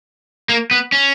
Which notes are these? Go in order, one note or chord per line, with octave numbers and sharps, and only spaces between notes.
A#3
B3
C#4